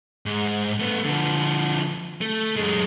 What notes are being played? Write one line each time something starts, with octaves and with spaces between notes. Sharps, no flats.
G#2
A3 B3
D3 F3
A3
F#2 G#3